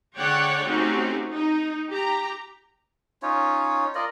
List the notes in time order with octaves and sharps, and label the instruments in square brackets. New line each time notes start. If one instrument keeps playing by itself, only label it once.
[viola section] D3 G#3 C#5 D5 F#5 G5
A3 C4 C#4 D#4 F#4 G4
D#4
G4 A#5
[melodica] C#4 D#4 F4 C#5
F4 A#4 D5 D#5